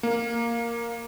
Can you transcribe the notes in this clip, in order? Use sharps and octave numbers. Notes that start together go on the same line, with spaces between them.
A#3